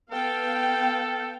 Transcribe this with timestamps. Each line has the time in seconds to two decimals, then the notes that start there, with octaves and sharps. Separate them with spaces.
0.12 B3 A4 F5 G5